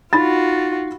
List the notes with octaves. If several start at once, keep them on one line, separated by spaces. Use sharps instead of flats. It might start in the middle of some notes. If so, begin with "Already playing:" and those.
D#4 F4 F#4 B5 A6